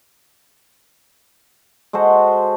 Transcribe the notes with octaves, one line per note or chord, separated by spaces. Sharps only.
G#3 F#4 A4 C5